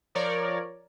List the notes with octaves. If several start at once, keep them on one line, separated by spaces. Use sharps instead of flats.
F3 A#4 C#5 D5